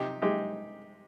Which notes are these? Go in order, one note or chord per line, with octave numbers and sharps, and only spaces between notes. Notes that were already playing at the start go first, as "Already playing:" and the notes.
Already playing: C3 D#4 G4
G#3 D#4 G4